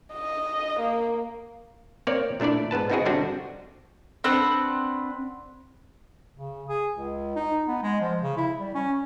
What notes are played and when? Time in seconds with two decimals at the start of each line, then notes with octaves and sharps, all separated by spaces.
0.14 D#5
0.80 A#3
2.07 A#3 C4 C#5 D5
2.40 A#2 A3 D4 E4 D5
2.71 G#2 B3 B4 A5
2.90 B3 C4 D#4 E4 F#4 G#4
3.06 D3 G3 C4 D4 F#4
4.24 C4 D4 B4 F#5
6.37 C#3
6.68 G#4
6.95 C#2
7.36 D#4
7.68 B3
7.82 G#3
8.01 F3
8.22 C#3
8.37 E4
8.60 G3
8.75 C#4